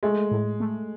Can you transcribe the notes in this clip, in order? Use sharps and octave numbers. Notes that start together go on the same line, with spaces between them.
G#3 A3
A2
A3